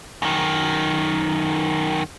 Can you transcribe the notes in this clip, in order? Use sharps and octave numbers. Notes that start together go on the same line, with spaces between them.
F#2 D#3